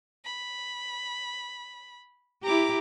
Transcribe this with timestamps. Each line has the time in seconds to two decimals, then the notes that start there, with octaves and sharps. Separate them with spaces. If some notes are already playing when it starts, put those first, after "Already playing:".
0.25 B5
2.43 E4 G4 A#5 D6